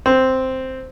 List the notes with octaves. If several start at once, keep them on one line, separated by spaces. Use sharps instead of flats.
C4